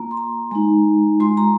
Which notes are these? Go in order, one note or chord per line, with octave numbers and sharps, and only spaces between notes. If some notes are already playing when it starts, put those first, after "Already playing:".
Already playing: A#3 F4 A#5
C6
A#5
G#3 D#4
G#3 F4 C6
A#5